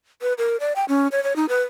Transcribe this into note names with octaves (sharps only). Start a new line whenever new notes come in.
B4
A#4
D5
G5
C#4
C#5
C#5
D#4
B4